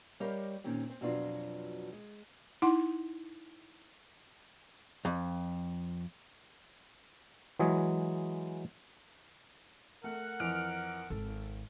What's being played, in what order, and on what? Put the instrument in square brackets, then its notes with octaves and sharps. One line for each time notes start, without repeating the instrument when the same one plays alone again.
[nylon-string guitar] G3 G4 A#4 C#5 D#5 F5
A#2 D#3 C4 C#4 G4
C4
F2 B2 F#3 B3 D4 F4
G#3
[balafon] D#4 E4 F#5 C6
[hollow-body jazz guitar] F2
[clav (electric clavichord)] E3 F#3 G#3 G#4
[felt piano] A3 [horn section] A#4 F#5
[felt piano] F2 E3 [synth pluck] F6 D7
[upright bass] G#1 [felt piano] A4